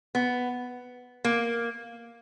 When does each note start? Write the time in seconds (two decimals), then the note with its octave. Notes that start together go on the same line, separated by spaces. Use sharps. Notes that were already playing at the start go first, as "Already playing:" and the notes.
0.15 B3
1.24 A#3